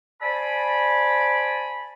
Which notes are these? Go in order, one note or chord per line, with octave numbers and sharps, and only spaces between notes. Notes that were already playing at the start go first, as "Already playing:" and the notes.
C5 D5 G#5 A5 B5